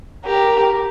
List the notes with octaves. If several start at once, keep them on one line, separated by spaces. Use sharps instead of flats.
G4 A#4